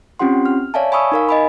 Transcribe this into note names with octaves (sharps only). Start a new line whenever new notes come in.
C4 C#4 F4 G4 F#5 C6
F6
C#5 D5 E5 F5 G#5 A5
G#5 B5 C#6 D#6 E6
D#4 A#4 F5
D#5 G#5 B5